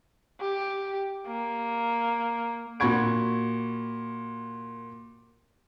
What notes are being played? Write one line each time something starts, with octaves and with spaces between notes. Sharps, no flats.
G4
A#3
A#2 F#4 B5 C#6 G#6 D7